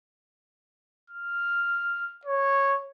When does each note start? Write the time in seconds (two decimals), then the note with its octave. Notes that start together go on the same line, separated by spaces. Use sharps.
1.10 F6
2.25 C#5